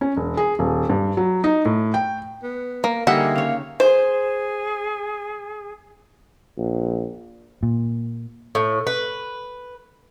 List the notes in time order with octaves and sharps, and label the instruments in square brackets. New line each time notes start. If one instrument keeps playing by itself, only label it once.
[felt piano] C#4
E1
G#4
D#1
G2
F#3
D#4
A2
G5
[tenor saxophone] B3
[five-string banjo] A#3 [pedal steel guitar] A#4
[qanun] D3 G3 D#4 [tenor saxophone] A#3 [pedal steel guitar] G#4 D#5 [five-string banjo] E5 F#5
[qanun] C#3 C#5 [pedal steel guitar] F5
[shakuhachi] G#4 [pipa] C5
[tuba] A#1
[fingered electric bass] A#2
[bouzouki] A2
B4